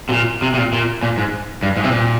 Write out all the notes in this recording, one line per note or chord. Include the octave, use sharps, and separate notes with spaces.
C3
A#2
C3
C3
A#2
A#2
A#2
G#2
G2
G#2
C3
A#2